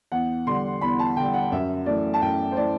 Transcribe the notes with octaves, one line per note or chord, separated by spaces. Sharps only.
E2 F#5
D3 G3 C6
E2 B5
A5
D3 G3 G5
F#5
F#2 E5
E3 A3 D5
A5
F#2 G5
C5
E3 A3 D5